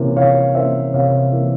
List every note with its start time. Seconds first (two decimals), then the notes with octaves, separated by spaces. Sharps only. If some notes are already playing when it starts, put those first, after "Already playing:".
Already playing: C3 E3 A#3 C#4
0.16 C3 C#5 F5
0.55 E3 A#3 C#4 C5 E5
0.93 C3 C#5 F5
1.32 E3 A#3 C#4